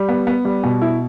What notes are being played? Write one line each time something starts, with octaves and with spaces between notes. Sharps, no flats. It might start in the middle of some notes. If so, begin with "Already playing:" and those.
Already playing: G3
B3
B3
G3
B2
E4